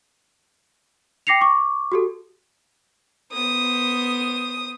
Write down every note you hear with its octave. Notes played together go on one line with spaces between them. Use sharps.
G5 D6 A#6 C7 C#7 F7
C#6 D6
F#4 G4 A4
B3 C5 D#6